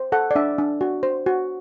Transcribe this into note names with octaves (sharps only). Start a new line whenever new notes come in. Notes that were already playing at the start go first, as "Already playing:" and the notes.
Already playing: C5
A4 F#5
D5
D4 E5
D4
F#4
C5
F#4